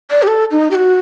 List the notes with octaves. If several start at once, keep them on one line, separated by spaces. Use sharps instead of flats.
D5
G4
A4
D#4
G4
F#4